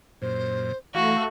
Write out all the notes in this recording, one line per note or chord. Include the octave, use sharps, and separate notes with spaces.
F#2 A#2 C5
E3 A3 F#4 F5 A#5